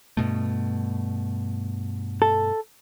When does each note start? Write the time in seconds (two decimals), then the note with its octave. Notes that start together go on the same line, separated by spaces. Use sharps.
0.17 G2 B2 A3
2.22 A4